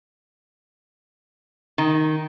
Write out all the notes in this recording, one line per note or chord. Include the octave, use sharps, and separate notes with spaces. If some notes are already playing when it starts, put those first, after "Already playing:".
D#3